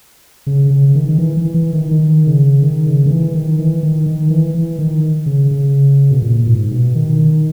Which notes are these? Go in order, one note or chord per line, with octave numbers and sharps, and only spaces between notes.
C#3
C#3
D#3
D#3
E3
E3
E3
D#3
D#3
C#3
D#3
C#3
D#3
E3
D#3
E3
D#3
D#3
E3
E3
D#3
C#3
C#3
B2
A#2
G#2
B2
D#3
D#3